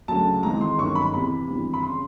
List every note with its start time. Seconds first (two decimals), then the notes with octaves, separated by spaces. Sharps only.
0.08 D2 C#3 F#3 A5
0.43 G#1 G#2 E3 A#5
0.61 C6
0.78 G1 F#2 D#3 C#6
0.95 B5
1.13 E2 C3 E3 B5
1.48 G#1 G2 E3
1.74 B5
1.83 C#3 C6